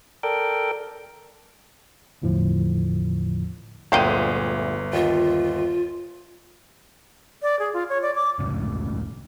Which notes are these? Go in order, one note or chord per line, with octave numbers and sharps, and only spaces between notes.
A4 A#4 D5 G5
G1 E2 A2 D3 F3
G1 D2 A#2 G#3 C5 F5 G5 D#7
D#2 F4
D5
G#4
F4
C#5
D5
D6
F1 C#2 A2 C#3